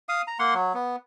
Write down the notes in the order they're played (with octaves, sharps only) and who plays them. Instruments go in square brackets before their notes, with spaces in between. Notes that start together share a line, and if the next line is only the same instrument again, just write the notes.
[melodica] F5 D#6
A#5
A#3 F#5 C6
F#3
B3